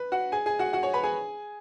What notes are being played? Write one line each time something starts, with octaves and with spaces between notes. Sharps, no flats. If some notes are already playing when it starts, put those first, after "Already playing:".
Already playing: B4
F#4 F#5
G#4 G#5
G#4 G#5
F#4 F#5
F#4 F#5
C#5
B4 B5
G#4 G#5